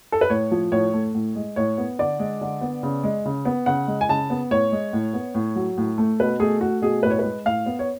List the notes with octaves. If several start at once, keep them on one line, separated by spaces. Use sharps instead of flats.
A4
B4
A2 C#5
F3
A2 C#5
A3
A2
G#3
A2 C#5
B3
D3 D5
G#3
D3
B3
C#3
G#3
C#3
B3
C#3 F#5
G#3
G#5
C#3 A5
B3
A2 C#5
G#3
A2
B3
A2
F#3
A2
A3
B2 B4
A3 G#4
A3 F#4
B2 G#4
A2 B4
C#5
G#3 B4
A2 F5
B3
C#5